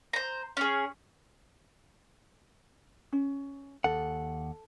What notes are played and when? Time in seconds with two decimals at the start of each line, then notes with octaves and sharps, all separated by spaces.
0.13 C5 A#5
0.57 C#4 G#4
3.13 C#4
3.84 D#2 A4 F#5